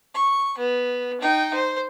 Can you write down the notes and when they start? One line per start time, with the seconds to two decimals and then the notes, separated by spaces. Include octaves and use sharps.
0.14 C#6
0.58 B3
1.21 D#4 G5
1.54 C5